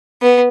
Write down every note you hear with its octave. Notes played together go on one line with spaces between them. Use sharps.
B3